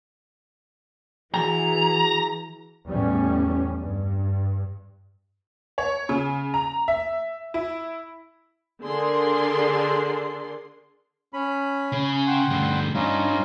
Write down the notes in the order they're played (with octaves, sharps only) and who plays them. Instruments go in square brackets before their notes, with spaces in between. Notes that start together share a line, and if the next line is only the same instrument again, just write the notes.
[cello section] E3 [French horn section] F#4 G#4 [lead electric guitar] A#5
[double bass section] E2 A2 G3 C#4
G2
[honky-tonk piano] C#5
C#3
A#5
E5
E4
[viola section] D3 G#4 A#4 D5 C6
[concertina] C#4 B5
[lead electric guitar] C#3
[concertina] F#5 G5 C6
[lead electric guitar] D2 G2
[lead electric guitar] G2 [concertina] C#4 D#4 F4